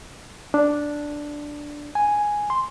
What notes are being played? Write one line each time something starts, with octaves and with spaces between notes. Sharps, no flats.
D4
G#5
C6